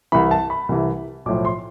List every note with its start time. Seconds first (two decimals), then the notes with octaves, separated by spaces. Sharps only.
0.12 C2 C3 E3 B5
0.31 A5
0.50 B5
0.69 C2 C3 E3
1.26 B1 A2 F3 D6
1.45 C6